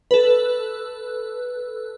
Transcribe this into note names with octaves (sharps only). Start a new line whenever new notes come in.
A4 B4